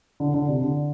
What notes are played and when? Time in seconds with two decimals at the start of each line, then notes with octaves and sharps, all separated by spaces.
0.20 D3
0.34 D3
0.48 C3
0.62 D3